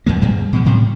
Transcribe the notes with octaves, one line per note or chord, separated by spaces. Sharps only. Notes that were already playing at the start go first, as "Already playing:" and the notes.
E2 F3 A#3
G2 G3 G#3
B2 F3
A2 C3 G3